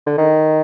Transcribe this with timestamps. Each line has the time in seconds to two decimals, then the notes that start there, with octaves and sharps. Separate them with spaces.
0.07 D3
0.18 D#3